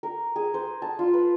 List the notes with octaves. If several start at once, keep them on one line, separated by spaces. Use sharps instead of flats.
A#4
G#4
C5
A5
F4
B4